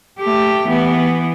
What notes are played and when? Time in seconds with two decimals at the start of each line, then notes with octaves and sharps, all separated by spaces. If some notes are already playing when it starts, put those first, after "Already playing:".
0.19 A3 G4
0.68 E3 B3